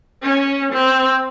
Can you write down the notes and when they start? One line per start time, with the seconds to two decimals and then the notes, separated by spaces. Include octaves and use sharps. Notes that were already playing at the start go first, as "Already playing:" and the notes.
0.23 C#4
0.73 C4